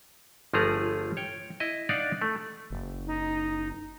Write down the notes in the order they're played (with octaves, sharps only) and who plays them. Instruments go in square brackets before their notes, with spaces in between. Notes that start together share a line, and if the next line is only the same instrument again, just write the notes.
[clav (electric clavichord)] G1 F3 A3 G#4 A#5
C#5 G5
E4 D#5
D4 D#4 D5 F5 F#5
A3
[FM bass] F#1
[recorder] D#4